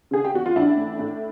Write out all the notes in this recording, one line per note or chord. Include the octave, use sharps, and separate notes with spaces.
C#3 G#4
G4
E2 F#4
F4
A1 D4 E4
A2
A2